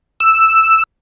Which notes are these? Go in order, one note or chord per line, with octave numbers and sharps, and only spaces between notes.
E6